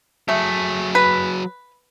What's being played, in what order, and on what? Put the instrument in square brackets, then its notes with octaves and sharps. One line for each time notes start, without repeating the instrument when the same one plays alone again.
[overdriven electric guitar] F#3 G#4 [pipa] A3
[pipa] B4